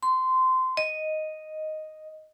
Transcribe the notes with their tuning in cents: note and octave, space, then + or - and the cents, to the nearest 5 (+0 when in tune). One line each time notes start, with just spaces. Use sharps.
C6 -20
D#5 +0